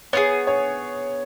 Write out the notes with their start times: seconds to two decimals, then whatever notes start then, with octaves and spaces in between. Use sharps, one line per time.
0.13 B3 F4 G#4 C#5
0.47 C#5